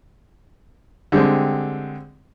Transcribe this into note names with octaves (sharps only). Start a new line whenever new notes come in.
D3 G3 G#3 C4